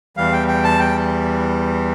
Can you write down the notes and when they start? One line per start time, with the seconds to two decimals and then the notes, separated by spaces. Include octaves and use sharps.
0.17 E2 E3 G3 F5
0.32 G5
0.48 G5
0.64 A5
0.80 G5